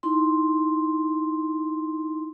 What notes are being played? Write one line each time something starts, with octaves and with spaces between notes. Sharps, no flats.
D#4 E4 C6